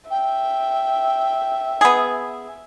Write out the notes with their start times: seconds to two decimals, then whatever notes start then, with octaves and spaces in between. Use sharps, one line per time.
0.11 E5 G5
1.81 B3 G#4